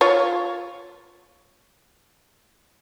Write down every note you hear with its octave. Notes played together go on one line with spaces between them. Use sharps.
F4 C#5